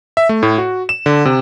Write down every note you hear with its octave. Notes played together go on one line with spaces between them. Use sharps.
E5
A3
A2
F#4
E7
D3
C3